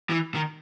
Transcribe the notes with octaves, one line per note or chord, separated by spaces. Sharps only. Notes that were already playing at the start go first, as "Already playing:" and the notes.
E3
D#3